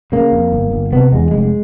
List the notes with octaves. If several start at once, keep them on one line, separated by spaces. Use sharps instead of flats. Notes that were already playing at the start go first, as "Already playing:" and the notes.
C#3 A#3
F2
G1
G1
C3 B3
E2 G#3
F1 G#3